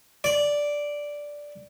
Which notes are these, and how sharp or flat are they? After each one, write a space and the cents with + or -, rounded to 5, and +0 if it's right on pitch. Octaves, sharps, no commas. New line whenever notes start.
D5 -5